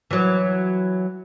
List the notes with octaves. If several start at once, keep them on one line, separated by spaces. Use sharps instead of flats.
E3 F#3